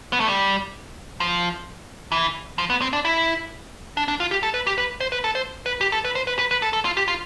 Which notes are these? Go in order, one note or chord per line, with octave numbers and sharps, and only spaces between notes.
B3
A3
G3
F3
E3
F3
B3
C4
D4
E4
D4
D4
F4
G4
A4
B4
G4
B4
C5
B4
A4
C5
B4
G4
A4
B4
C5
B4
B4
B4
A4
A4
F4
G4
F4